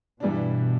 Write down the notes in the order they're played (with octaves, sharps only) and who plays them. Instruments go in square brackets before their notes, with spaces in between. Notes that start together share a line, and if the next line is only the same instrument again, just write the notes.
[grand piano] G2 E3 G3 D4 [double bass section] B2